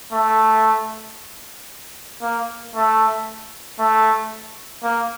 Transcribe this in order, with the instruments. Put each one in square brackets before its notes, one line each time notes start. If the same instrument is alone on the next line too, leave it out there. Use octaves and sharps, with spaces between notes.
[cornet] A3
A#3
A3
A3
A#3